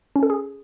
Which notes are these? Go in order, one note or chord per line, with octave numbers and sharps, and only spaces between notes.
C#4
A4
G#4